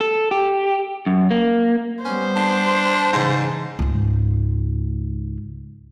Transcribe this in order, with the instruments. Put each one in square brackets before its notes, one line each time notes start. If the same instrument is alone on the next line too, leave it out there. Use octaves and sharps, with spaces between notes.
[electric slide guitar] A4
G4
F#2
A#3
[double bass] G3 B3 [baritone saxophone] C#4 [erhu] C5
[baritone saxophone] D4
[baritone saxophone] G#2 [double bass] C#3 E3
[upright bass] C#2 G#2